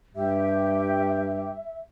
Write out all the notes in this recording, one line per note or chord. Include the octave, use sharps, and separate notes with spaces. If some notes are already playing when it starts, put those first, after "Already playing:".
G2 G4 E5